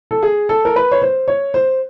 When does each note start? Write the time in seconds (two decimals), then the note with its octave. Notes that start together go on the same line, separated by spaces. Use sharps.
0.11 A4
0.23 G#4
0.49 A4
0.65 A#4
0.76 B4
0.91 C#5
1.02 C5
1.28 C#5
1.54 C5